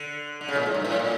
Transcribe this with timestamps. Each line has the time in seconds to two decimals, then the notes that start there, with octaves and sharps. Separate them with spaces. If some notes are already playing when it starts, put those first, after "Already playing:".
Already playing: D3
0.41 D3
0.48 C#3
0.56 A#2
0.66 A2
0.74 G2
0.85 A2
0.99 A#2